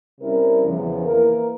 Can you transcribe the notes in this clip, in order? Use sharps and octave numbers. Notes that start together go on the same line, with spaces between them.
C3 G3 C#4 E4 A#4
E2 C#3 F3
E3 A#3 E4 A#4